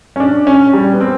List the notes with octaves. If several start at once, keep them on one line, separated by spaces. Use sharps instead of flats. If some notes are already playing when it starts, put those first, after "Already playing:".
C#4
D4
C#4
G3
B3
C4